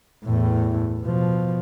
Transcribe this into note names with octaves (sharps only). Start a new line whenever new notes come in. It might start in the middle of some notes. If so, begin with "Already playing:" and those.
E2 A2
B2 F3